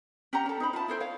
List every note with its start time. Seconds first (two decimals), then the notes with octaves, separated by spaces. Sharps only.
0.33 C#4 G4 F#5 A#5
0.46 C#4 A4
0.60 D#4 C5 B5
0.73 F4 E5 A5
0.88 E4 A4 C5 G5
1.00 C#5 F5